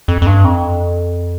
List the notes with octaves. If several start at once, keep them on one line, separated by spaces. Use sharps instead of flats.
F2
F2
G2
F2